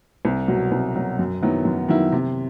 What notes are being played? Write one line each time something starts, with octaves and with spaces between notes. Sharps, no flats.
C2
B2 F#3
C2
B2 F#3
F#2
D#3 F#3 B3 E4
F#2
D#3 F#3 B3 E4
C3